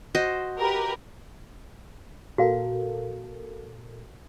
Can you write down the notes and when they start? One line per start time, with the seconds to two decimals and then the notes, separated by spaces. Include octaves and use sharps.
0.15 F#4 C5 D#5
0.59 G4 A#4 B4
2.38 A#2 F#4 A4 A#4 F5